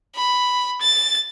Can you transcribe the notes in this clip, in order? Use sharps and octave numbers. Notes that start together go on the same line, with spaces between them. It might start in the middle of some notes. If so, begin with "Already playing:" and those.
B5
A6